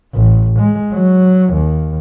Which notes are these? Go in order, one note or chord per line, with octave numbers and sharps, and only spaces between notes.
A1
G#3
F#3
D#2